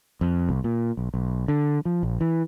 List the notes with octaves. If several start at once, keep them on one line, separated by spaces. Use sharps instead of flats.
F2
C2
A#2
B1
B1
D3
F3
A#1
E3